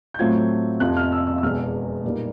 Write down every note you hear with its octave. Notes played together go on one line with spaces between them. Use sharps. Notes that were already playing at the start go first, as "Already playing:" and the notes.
G6
A2 F#3 A3 C4 F4 G#6
F2 C3 F3 F#6
F6
E6
E6
E6
E1 E2 B2 F6
A#2 G3 A#3 D#4